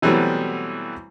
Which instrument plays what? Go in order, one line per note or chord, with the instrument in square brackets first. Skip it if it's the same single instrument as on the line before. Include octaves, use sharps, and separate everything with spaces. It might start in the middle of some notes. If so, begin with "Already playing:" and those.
[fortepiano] B2 E3 F#3 G3 A3 C4